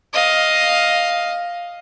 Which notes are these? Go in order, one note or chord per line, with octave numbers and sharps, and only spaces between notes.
D#5 F5